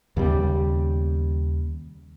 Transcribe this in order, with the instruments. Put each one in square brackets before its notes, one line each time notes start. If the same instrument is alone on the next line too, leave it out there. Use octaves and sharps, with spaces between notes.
[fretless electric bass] D#2 C#3 G3 B3